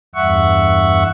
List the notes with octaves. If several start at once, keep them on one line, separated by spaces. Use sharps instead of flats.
E2 G2 E5 F#5 C#6